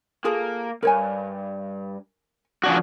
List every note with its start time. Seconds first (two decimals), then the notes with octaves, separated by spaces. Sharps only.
0.24 A#3 F4 G#4 A4
0.83 C2 G2 A#4 C#5 G#5
2.64 A#2 C#3 F3 D4 F#4